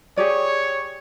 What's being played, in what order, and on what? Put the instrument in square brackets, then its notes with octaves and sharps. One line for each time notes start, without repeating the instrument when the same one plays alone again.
[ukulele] G4 G#4 D5 [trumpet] C#5